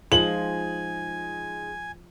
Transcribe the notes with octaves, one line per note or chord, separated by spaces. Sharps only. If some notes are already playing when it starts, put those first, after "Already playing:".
F3 G#3 D#4 C5 G#5 F#7